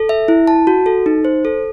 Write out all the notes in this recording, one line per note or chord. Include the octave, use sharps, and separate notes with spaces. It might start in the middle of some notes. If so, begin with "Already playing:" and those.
Already playing: A4
E5
E4
A5
F#4
A4
D#4
C5
A4